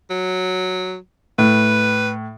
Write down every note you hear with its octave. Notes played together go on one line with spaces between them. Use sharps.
F#3
A2 B4